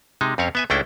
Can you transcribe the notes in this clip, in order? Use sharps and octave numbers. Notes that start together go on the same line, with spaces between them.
C3 G#3 D#4
F2 C4 C#4 C#5 F5
B3 E5 G#5
C#2 A3 C#4 D4 E4 G5